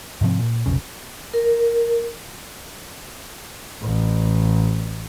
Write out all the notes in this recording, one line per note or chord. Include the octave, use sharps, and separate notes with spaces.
G#2 C3 F3 C4
A#2
F1 B1 C#3
A#4
A1